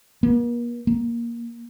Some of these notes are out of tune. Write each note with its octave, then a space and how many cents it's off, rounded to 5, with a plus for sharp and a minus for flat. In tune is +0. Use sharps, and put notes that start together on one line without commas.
A#3 +40
A#3 +10